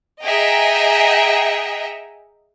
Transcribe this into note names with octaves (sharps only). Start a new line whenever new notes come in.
G#4 D#5 E5 F#5 G5 A#5